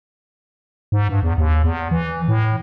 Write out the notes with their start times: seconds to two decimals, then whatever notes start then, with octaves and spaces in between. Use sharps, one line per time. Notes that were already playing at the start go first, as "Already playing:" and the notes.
0.92 G#2
1.09 G2
1.23 E2
1.38 D#2
1.64 E2
1.91 E3
2.28 A2